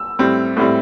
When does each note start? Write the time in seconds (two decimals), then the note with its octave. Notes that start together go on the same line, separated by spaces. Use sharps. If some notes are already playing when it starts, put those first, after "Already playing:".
Already playing: E6
0.19 A2 G3 C4
0.57 A2 G3 C4